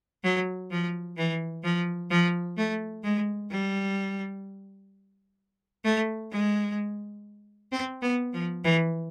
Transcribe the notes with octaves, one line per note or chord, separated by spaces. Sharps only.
F#3
F3
E3
F3
F3
A3
G#3
G3
A3
G#3
C4
B3
F3
E3